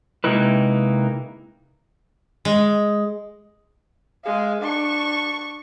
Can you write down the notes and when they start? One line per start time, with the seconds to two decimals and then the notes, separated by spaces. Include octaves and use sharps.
0.24 C3 G#3 A#3 D#4 E4 B4
2.45 G#3
4.24 G#3 F5
4.62 D4 C#6